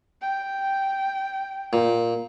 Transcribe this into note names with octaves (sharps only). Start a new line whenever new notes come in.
G5
A#2